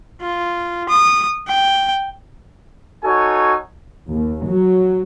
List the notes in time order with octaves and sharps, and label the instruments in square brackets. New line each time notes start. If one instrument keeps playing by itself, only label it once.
[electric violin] F4
D#6
G5
[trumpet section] D#4 F#4 A4 C#5 G#5
[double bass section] D#2
F#3